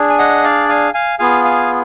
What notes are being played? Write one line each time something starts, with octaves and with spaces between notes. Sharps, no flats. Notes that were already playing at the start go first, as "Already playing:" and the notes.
Already playing: D4 G#4
G#5
D#5 F#5
D5 F5
F5 G#5
F5 G#5
B3 F4 G#4 F5 G#5
F5 G#5